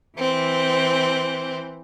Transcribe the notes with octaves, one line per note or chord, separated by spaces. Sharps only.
E3 C4